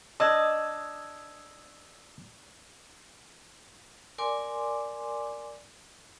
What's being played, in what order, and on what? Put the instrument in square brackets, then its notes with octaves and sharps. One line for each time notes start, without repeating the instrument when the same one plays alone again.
[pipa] D4 [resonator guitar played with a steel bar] D#5 [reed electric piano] D#6 E6 G#6
[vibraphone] A#4 D5 G#5 C6 D6